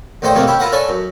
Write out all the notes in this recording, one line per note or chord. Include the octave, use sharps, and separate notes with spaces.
D#2 A2 D4 C5 G5 D#6
F2 C3 D#3 G3 A3 A#3
C#4 E4 G4
E4 F4 A#4 B4 F#5
A4 B4 C#5 D5 G#5 A5
F#2